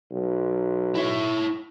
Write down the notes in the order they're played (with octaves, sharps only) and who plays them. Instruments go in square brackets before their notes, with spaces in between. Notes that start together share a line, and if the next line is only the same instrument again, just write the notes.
[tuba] B1
[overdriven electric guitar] E4 C#5